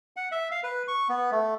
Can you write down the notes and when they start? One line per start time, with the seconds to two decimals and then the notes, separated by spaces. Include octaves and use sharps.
0.16 F#5
0.32 E5
0.51 F5
0.64 B4
0.88 C#6
1.09 B3
1.32 A3